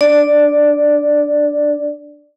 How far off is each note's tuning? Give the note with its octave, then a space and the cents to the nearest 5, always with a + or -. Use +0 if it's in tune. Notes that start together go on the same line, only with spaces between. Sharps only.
D4 +0 D5 +0